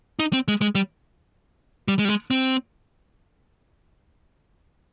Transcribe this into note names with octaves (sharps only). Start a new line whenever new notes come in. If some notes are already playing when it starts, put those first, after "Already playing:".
D#4
C4
G#3
G#3
G3
G3
G#3
G3
G#3
C4